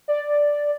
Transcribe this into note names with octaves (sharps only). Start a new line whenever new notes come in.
D5